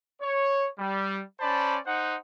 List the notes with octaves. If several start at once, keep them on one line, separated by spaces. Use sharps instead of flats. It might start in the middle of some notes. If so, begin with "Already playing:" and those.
C#5
G3
C#4 C5 D5 A5 B5
D#4 C5 F#5